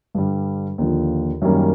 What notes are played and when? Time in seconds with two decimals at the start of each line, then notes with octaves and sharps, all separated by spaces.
0.15 G2 D3 G3
0.78 D#2 D3 F3
1.42 F#2 D#3 G3 A#3 C#4